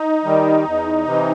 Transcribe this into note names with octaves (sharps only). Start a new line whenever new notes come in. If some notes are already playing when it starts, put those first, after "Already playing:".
Already playing: D#4
D#3 G3
E2
C3 E3